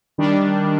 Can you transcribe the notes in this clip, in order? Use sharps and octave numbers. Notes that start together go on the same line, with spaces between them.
D#3 G3 D4